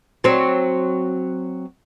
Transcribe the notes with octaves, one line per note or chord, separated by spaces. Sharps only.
F#3 C4